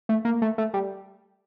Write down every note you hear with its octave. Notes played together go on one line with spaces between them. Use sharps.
A3
A#3
A3
A3
G3